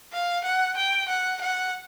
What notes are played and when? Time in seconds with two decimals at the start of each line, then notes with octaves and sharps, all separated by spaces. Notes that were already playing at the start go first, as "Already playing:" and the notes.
0.12 F5
0.44 F#5
0.77 G5
1.09 F#5
1.41 F#5